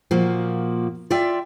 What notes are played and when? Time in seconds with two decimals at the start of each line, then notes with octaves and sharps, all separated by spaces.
0.11 A#2 F3 A#3 F#4
1.10 F4 D5 E5 G5